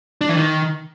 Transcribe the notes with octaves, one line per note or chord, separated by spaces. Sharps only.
D4
E3
D#3